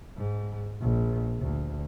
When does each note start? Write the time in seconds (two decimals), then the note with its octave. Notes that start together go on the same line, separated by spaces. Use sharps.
0.17 G#2
0.80 A#1
1.40 D2